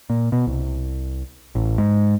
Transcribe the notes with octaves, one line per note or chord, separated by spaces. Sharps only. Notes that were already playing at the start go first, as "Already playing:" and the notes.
A#2
B2
C2
A1
G#2